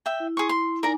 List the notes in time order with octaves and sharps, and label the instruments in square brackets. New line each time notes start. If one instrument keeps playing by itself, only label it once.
[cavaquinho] E5 G5
[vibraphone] E4
[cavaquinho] G#4 C6 C#6
C6
[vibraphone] D#4 G#5 [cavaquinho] A#4 D5 A#5